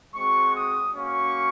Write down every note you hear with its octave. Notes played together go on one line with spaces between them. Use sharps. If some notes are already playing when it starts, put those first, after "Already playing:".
G#3 C4 F#4 C#6
D#6
A#3 C#4 F#4 C#6